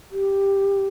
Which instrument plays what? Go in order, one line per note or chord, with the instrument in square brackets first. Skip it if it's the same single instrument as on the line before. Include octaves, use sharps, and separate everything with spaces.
[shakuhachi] G4